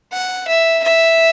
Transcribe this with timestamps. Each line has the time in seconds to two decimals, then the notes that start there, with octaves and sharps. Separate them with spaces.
0.12 F#5
0.48 E5
0.84 E5